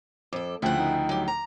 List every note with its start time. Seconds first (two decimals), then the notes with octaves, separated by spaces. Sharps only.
0.33 F2 A4 D6
0.62 D2 C#3 F3 A3 E4 F#5 G5
0.78 D#4
1.09 F#3 G4
1.28 A#5